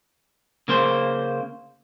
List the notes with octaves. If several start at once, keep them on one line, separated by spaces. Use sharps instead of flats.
C#3 A#3 C5